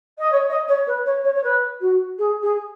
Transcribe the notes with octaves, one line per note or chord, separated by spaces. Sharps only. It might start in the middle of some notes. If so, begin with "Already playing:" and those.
D#5
C#5
D#5
C#5
B4
C#5
C#5
C#5
B4
F#4
G#4
G#4